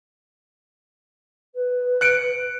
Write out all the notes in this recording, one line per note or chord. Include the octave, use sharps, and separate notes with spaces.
B4
F#6 C#7 D7